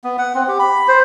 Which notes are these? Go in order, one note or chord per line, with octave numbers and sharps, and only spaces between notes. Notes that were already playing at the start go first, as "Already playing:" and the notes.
B3
F#5
C4
G4
B5
C5